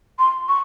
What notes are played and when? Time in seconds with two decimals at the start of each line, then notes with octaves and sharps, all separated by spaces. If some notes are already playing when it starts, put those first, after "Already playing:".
0.19 C6
0.48 C#6